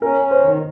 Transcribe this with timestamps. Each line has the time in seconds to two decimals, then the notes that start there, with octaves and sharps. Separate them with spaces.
0.02 C#4 A#4
0.22 C#4
0.31 C5
0.42 D#3